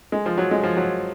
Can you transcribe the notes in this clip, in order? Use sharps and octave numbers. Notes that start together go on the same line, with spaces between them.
G#3
F3
F#3
G#3
F3
F#3